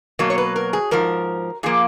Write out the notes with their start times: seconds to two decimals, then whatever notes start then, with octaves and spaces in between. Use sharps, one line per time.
0.19 B2 F#3 A#3
0.30 C#5
0.38 B4
0.56 A#4
0.73 G#4
0.91 G#2 F3 A#4
1.63 A#2 F3 A#3 G#4